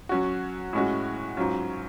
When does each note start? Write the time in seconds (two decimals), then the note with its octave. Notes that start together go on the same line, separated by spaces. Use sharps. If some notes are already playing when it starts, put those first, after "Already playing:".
0.09 F#3 C#4 F#4
0.73 A2 G#3 C#4 F#4
1.37 G#2 F#3 C#4 F4